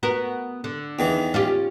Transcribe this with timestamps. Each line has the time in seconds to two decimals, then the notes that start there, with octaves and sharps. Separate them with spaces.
0.03 B3 F#4 A#4
0.64 D3
0.99 E2 D#3 E3
1.34 C#4 F4 G4